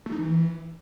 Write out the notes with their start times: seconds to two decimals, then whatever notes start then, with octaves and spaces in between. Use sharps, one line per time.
0.06 A3
0.12 D#4
0.18 E3